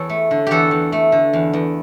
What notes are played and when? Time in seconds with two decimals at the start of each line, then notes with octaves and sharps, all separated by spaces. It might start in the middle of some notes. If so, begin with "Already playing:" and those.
Already playing: E2 A4 C#5
0.10 A3
0.31 D3
0.47 E2 F#4 G4 A4
0.71 E2
0.92 A3
1.12 D3
1.33 E2
1.53 E2